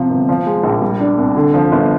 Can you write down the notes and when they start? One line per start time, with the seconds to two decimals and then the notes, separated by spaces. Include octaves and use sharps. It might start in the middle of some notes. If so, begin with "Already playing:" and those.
Already playing: C3 F3
0.10 G1
0.29 F3
0.46 G#3
0.63 A#1
0.82 G3
1.00 D4
1.18 C2
1.36 D3
1.54 F3
1.72 G1